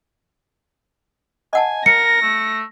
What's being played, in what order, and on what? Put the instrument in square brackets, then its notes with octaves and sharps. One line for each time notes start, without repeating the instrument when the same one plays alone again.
[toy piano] D#5 F#5 A5 [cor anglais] G#5
[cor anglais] A#4 [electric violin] A#6 [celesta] C#7
[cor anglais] A3